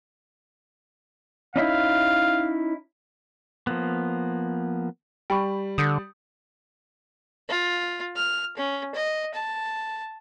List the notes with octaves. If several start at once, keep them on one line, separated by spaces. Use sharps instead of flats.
C#4 D#4 E4 F5
F3 A#3 B3
G3 G5 B5 C#6
D3 D#6 G6 C#7
F4
F6
C#4
D#5
A5